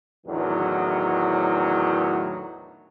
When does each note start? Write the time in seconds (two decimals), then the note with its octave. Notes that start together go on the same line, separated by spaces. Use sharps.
0.26 E2 A2 D3 D#3 F#3